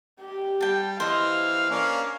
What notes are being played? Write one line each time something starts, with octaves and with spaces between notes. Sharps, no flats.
G4
G3 G5 A5
E3 C5 D#5 F5
A#3 C#4 D4